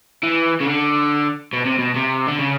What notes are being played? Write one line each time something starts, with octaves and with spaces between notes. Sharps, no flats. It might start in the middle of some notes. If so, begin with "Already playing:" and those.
E3
C#3
D3
B2
C3
B2
C3
D3
C#3